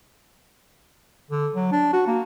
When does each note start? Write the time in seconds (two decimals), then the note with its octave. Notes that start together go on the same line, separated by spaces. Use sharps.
1.30 D3
1.55 F#3
1.72 D4
1.93 F#4
2.07 A#3